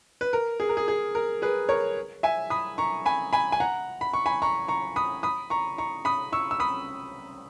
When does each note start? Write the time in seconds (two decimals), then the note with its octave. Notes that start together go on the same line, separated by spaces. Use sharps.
0.21 B4
0.33 A#4
0.60 G#4
0.69 A#4
0.77 G#4
0.88 G#4
1.15 A#4
1.42 G#4 B4
1.69 A#4 C#5
2.23 E5 G#5
2.50 B5 D#6
2.78 A#5 C#6
3.06 G#5 B5
3.33 G#5 B5
3.52 G#5
3.60 F#5 A#5
4.01 B5
4.14 C#6
4.26 G#5 B5
4.42 A#5 C#6
4.68 A#5 C#6
4.96 B5 D#6
5.23 B5 D#6
5.50 A#5 C#6
5.78 A#5 C#6
6.05 B5 D#6
6.32 C#6 E6
6.51 E6
6.60 B5 D#6